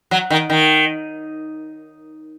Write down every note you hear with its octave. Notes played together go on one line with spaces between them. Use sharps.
F#3
D#3
D#3